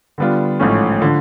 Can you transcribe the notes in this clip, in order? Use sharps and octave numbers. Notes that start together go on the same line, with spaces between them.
D3 G3 B3 D4 F4
A1 G#2 F3 A3 C#4
D3 F3